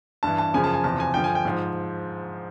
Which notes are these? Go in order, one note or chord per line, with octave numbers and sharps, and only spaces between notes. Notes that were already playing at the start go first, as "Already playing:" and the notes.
G2 E3 A5
A5
F#2 C#3 F3 G#5
A5
G#5
E2 C3 F3 A5
G#5
G2 D3 F3 G5
G#5
G5
G#2 F3